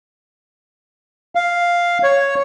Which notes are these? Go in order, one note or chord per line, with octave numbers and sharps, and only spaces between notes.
F5
C#5